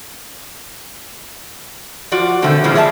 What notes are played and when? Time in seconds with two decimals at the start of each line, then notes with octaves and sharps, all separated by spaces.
2.12 F3 F4 F#4 D5
2.42 B2 D3 D#3 A3 C4
2.64 A#2 E3 F3 G#3 B3 C#4
2.75 G#4 D5 E5 G5 A5